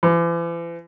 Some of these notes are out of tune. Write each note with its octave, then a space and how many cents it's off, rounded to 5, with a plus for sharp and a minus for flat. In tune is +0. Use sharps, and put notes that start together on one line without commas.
E3 +40